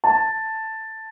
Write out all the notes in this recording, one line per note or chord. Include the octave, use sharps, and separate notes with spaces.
A5